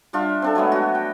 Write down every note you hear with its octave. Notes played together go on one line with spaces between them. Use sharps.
G3 D4 F4 E5
C4 D4 A4
F#3 G#3 A3 B3
F#4
G5